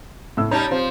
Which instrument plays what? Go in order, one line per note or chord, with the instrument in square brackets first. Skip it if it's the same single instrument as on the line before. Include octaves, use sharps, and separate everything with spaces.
[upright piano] A2 E6
[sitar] G3 C#4 D#4 [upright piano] A5 A#5
[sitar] F3 [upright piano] C4